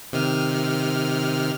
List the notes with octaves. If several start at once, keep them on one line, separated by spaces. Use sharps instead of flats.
C3 D#3 F6